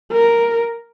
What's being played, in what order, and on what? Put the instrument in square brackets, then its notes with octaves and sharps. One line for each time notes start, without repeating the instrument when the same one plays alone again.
[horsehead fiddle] A#4